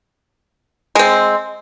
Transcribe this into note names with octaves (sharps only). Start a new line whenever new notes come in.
G#3 C4